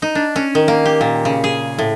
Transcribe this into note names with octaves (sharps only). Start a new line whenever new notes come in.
D#4
D4
C#4
D#3
A#3
G4
A#2
C#3
G#4
A2